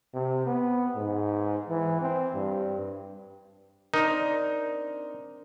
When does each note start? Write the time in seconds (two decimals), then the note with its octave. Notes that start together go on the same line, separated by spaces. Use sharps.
0.14 C3
0.46 B3
0.95 G#2
1.69 E3
2.01 C4
2.34 G2
3.94 C4 D4 D#4 A#4